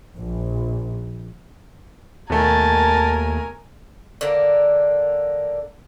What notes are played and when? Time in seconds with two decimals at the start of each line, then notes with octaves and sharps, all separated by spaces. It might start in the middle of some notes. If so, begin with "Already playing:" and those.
0.16 A#1
2.30 D#2 B2 A3 A#4 G#5 A5
4.21 D3 A#3